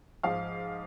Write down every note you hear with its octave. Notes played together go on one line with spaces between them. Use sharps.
G#2 F3 F5